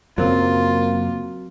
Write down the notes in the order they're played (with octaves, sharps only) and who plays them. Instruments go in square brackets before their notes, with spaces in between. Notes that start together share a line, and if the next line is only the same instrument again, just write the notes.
[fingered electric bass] F#2 C#3 [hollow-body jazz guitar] F#3 C4 [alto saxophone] A#3 [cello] F4